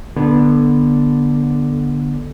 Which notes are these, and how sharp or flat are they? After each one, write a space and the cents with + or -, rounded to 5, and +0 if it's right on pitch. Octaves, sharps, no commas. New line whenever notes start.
D3 +0 B3 -25